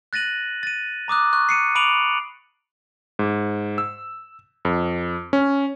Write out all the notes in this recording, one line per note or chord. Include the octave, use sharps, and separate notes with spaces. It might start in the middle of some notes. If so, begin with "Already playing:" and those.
F#6 A6 A#6 D#7 F#7
A6 D#7
A#5 D6 D#6 F#6
C#6 F#6
C7 C#7 D#7
B5 D6 D7 D#7 F7 F#7
G#2
E6
F2
C#4